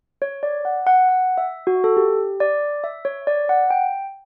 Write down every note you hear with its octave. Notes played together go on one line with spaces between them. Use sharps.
C#5
D5
F#5
F#5
F#5
E5
F#4
A4
G4
D5
E5
C#5
D5
F#5
G5